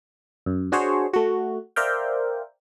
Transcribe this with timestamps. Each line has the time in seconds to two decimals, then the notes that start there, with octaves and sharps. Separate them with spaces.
0.46 F#2
0.72 D4 F#4 G#4 C5 C#5
1.13 A3 F#4
1.76 A#4 C5 D5 E5 F5 G5